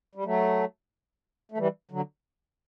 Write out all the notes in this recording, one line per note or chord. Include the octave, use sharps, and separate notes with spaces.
G3
F#3 A3
A3
E3 G3
D3 F#3